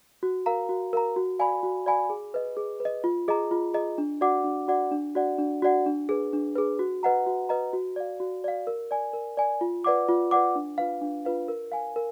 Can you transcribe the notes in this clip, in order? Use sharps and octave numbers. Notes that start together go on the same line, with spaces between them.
F#4
A#4 F5 A#5
F#4
A#4 F5 A#5
F#4
D5 F5 G#5 B5
F#4
D5 F5 G#5 B5
G#4
B4 D#5
G#4
B4
D#5
F4
G#4 D#5 A#5
F4
G#4 D#5 A#5
D4
F#4 D5 F#5 D6
D4
F#4 D5 F#5 D6
D4
F#4 D5 F#5
D4
F#4 D5 F#5
D4
G#4 B4
D4
G#4 B4
F#4
B4 D#5 F#5 A#5
F#4
B4 D#5 F#5 A#5
F#4
D5 F5
F#4
D5 F5
A#4
D5 G#5
A#4
D5 G#5
F4
B4 D5 F#5 D6
F4
B4 D5 F#5 D6
D4
F4 B4 F5
D4
F4 B4 F5
A#4
F5 G#5
A#4